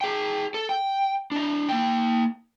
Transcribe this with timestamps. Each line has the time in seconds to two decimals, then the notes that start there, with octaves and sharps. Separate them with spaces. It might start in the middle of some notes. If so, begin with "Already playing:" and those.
0.01 G#4 G5
0.54 A4
0.69 G5
1.32 D4 D#5
1.69 A#3 G5